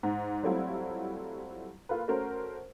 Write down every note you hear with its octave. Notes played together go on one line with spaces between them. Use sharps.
G#2
F#3 G3 A3 C4 E4 F4
A#3 F4 A4 B4
A3 C#4 F#4 A#4 C5